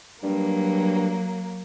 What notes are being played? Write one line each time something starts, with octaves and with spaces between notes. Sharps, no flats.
G2 F#3 A#3